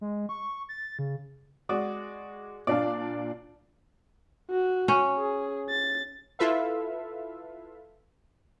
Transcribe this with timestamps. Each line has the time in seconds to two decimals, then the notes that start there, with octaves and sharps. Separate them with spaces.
0.01 G#3
0.29 C#6
0.69 A6
0.99 C#3
1.69 G#3 F#4 D5 D#6
2.67 A#2 D4 D5 F5 A5
4.50 F#4
4.88 C#4
5.18 G#4
5.69 A6
6.39 E4 F4 A4 B4 E5 F5